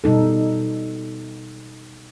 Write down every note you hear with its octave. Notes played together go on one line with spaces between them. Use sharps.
B2 G3 D#4 A4